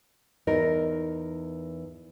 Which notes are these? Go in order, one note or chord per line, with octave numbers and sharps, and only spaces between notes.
E2 D#4 A#4